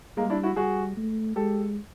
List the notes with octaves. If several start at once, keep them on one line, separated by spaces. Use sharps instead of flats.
G3 G#3 A#3
D4 E4
E4 F#4
G3 F#4 G#4
A3
G#3 G4 A4